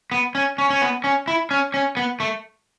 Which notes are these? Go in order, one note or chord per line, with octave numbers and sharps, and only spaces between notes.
B3
C#4
C#4
C#4
B3
C#4
E4
C#4
C#4
B3
A3